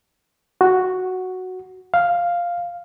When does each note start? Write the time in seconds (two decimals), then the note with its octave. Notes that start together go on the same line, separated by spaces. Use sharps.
0.61 F#4
1.94 F5